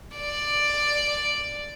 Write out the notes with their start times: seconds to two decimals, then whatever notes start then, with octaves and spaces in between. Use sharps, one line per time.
0.16 D5